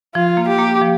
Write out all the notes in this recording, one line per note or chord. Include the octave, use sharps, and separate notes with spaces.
F3 F4
A#3
G4
A#3
F3